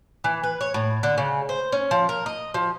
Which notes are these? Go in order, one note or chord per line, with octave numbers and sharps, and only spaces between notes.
E3
B4
C#5
A2
D3
C#3
C5
C#4
F3
A#4
D#5
F3